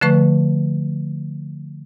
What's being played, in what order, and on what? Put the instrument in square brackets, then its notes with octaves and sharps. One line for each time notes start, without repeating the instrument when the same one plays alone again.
[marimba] D3 F3 A3 B4 C#6